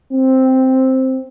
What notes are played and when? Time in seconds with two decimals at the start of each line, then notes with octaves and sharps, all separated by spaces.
0.12 C4